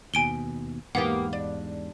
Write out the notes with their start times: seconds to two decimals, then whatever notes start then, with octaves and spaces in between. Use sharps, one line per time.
0.14 D#2 B2 G#5 D7 G7
0.95 E2 G#2 A#3 B3 G4 F#5
1.33 D4